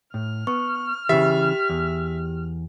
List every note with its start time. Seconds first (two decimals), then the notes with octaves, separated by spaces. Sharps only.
0.14 A2 F6
0.47 B3 C#6
1.09 C#3 E3 G4 E5
1.69 E2